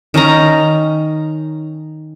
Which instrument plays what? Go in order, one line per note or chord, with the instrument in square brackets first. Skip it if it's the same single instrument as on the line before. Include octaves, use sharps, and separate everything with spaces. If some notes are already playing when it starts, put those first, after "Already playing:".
[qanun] D#3 C#4 D#4 A#5